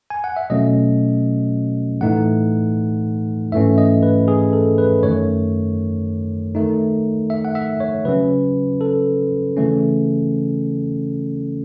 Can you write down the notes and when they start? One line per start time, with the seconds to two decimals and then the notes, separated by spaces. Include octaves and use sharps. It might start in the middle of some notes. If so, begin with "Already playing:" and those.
0.10 G#5
0.24 F#5
0.36 E5
0.50 B2 F#3 A3 C#4 D#5
2.01 A2 E3 A3 D#4 F#5
3.52 G#2 E3 A3 C#4 E5
3.78 D#5
4.03 B4
4.28 G#4
4.53 A4
4.78 B4
5.03 F#2 D#3 A3 C#5
6.55 D#3 A3 D#4
7.30 E5
7.45 F#5
7.55 E5
7.80 C#5
8.05 C#3 F#3 C#4 B4
8.81 A4
9.57 C#3 E3 A3 C#4